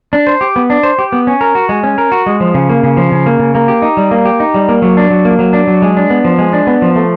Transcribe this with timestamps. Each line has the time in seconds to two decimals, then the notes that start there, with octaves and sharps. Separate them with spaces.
0.13 D4
0.27 C5
0.41 G4
0.56 B3
0.70 D4
0.83 C5
0.99 G4
1.12 B3
1.27 C#4
1.41 A#4
1.55 F#4
1.69 G#3
1.83 C#4
1.98 A#4
2.12 F#4
2.26 G#3
2.40 F3
2.54 C#3
2.69 A#3
2.83 C#3
2.97 F3
3.12 C#3
3.26 A#3
3.39 C#3
3.55 A#3
3.68 G4
3.82 D#4
3.97 G3
4.11 A#3
4.26 G4
4.40 D#4
4.54 G3
4.69 A#3
4.82 F#3
4.97 D4
5.10 F#3
5.25 A#3
5.39 F#3
5.53 D4
5.68 F#3
5.82 G#3
5.97 D4
6.10 B3
6.25 F3
6.38 G#3
6.53 D4
6.67 B3
6.82 F3
6.96 A3